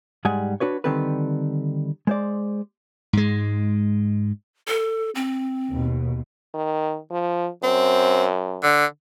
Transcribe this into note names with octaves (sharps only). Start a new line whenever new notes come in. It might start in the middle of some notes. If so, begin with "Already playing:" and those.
G#2 G3 G#3 F#5 G#5
D4 F#4 B4 C#5
D3 D#3 G3 C4 A4 B4
G#3 C5 D5
G#2 G#3
A4
C4
D#2 B2
D#3
F3
F#2 C4
D3